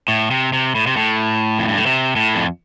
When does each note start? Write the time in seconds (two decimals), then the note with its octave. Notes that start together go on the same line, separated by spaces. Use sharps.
0.08 A2
0.31 C3
0.53 C3
0.75 A2
0.87 C3
0.97 A2
1.59 F2
1.68 G2
1.77 A2
1.86 C3
2.16 A2
2.35 F2